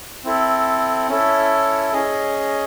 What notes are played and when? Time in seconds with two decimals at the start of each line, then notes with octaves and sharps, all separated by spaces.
0.24 C4 E4 A4
1.09 C#4 E4 A4
1.93 C#4 G#4 D#5